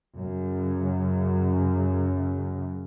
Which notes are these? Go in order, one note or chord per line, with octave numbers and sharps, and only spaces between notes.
F#2 C#3